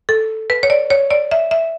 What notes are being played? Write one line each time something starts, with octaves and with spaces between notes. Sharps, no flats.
A4
B4
C#5
D5
C#5
D5
E5
E5